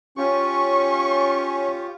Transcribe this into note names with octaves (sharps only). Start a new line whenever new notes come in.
C#4 F4 G4 C#6